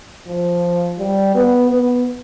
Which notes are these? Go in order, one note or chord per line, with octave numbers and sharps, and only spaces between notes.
F3
G3
B3
B3